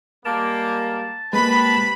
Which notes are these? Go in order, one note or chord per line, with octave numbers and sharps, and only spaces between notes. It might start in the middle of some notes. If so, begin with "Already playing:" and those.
G3 G#3 A#3 A5
G#3 A#3 C4 G4 B4 B5